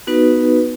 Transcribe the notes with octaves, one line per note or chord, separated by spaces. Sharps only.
B3 D#4 F#4 B4